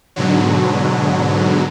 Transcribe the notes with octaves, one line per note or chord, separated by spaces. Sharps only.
G#2 B2 D3 F#3